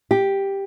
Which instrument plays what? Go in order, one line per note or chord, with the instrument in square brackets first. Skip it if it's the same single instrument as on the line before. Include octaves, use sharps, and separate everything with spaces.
[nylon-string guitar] G4